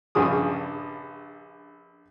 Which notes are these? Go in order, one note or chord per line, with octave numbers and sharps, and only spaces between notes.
A#1 G2 C#3 G#4 D#6